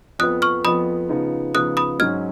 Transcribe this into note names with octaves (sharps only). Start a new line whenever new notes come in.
F2 F3 B3 D#6 F#6
C#6 F6
F2 F3 B3 B5 D#6
C#3 F3 B3 D#4
C#3 F3 B3 D#4 D#6 F#6
B5 D#6
G#2 F#3 C#4 F6 G#6